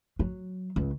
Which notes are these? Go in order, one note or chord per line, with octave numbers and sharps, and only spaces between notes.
F#3
C#2